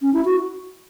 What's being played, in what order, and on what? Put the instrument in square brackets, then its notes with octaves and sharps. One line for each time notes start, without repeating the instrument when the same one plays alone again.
[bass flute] C#4
E4
F#4